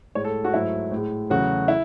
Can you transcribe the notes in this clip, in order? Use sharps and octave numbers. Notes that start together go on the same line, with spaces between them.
A2 G#3 C#5
A4
F#4
G#2 F#3 A3 E4
A2
G#3
E2 C#3 F#3 A3 F#4
E4